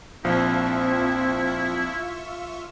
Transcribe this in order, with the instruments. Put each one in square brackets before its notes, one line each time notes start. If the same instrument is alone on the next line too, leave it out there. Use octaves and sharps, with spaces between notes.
[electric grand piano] A#1 F3 [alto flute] C4 [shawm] E4 [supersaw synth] F4 E5 C#6